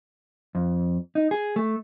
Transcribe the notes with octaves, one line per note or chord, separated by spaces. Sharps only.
F2
D#4
G#4
A3